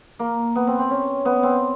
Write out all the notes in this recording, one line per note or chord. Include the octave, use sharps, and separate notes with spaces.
A#3
B3
C4
C4
C#4
B3
C4